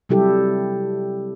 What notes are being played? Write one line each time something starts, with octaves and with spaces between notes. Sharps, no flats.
C3 F#3 G3 E4 G4 A4